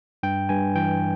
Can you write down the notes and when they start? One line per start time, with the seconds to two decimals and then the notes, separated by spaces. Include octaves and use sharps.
0.23 G2 G5
0.49 G2 G#5
0.75 E3 G5